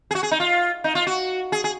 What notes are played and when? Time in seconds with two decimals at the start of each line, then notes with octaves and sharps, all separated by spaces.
0.11 G#4
0.15 F#4
0.23 G#4
0.31 D#4
0.40 F4
0.84 D#4
0.95 F4
1.07 F#4
1.52 G#4
1.64 G#4